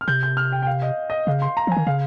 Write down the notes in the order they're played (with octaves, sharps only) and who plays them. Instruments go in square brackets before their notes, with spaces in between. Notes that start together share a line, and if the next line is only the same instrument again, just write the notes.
[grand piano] F6
[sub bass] C3 [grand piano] G6
[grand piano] G6
F6
G5
G5
F5
D#5
D#5
[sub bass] C#3 [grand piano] F5
[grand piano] C6
A#5
[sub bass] F3
[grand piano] G#5
[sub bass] D#3
[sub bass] C#3 [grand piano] F5